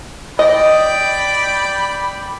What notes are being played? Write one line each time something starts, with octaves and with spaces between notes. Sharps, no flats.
D5 D#5 G5 B5